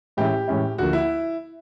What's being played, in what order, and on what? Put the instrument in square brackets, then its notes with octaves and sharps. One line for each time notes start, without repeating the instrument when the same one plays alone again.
[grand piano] A2 E3 G#3 C#4 E4 [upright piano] G4
[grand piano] A2 E3 G#3 C#4 E4
[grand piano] D2 D3 F3 A#3 [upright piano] F#4
[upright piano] E4